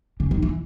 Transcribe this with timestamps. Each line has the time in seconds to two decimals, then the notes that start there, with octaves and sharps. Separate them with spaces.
0.20 C#3
0.31 D#3
0.43 E3